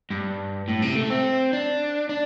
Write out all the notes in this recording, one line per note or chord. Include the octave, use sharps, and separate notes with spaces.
G2
A2
C3
A3
C4
D4
D4